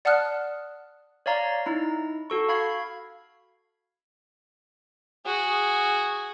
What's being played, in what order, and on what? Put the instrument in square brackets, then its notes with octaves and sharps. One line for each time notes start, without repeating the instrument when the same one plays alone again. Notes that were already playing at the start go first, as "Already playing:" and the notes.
[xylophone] D5 F#5 A5 D#6 F6 F#6
[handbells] C#5 D5 F5 A#5
D#4 E4 A#5
F#4 A4 C#6
F5 B5 G#6 C7
[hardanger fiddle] F#4 G#4